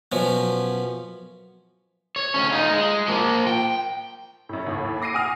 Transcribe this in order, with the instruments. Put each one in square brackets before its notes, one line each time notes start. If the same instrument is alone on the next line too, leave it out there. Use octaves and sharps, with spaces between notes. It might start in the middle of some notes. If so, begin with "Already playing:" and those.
[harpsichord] F#2 B2 F3 C#4
[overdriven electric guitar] C#5
D2 C#4
D#4 F4
G#3
F3 A#3
G5
[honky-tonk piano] F#2 A2
D#2 A2
D6 A#6 C7 D7 D#7
F#5 G#5 D#6 F6